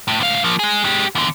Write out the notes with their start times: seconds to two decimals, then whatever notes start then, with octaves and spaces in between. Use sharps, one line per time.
0.08 A2
0.20 D2 F5
0.44 F3 A#3
0.59 G#3 G#4
0.84 G#3 G4
1.15 E2 D3